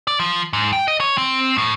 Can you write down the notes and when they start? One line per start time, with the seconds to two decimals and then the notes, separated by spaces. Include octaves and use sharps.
0.07 D5
0.20 F3
0.53 G#2
0.73 G5
0.88 D#5
1.00 C#5
1.18 C4
1.58 A2